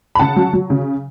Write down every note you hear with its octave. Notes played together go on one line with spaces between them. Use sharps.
B5
C#3 F#5 A5
F#3
F#3
C#3